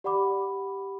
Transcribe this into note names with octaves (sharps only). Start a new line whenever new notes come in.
G4 D5 F#5 B5 D6